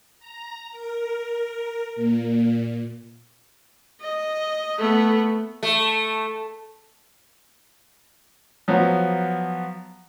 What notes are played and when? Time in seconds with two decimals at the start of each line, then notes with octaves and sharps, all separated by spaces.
0.19 A#5
0.72 A#4
1.96 A#2
4.01 D#5
4.78 A3 B3
5.63 A3
8.68 F3 F#3 B3